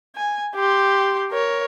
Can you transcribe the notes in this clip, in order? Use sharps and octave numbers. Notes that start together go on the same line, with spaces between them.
G#5
G4 C6
A#4 C#5